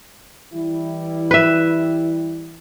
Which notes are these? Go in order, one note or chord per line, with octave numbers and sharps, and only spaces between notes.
E3 G3 E4
B4 E5